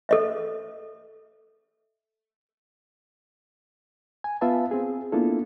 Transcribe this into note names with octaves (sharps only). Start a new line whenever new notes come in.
A4 D#5 E5
G#5
B3 F4 B4 E5 F5 A5
C4 G#4
A#3 B3 D4 E4 F4 A4